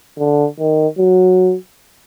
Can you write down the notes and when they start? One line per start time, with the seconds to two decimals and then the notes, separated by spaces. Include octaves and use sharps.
0.18 D3
0.59 D#3
0.98 F#3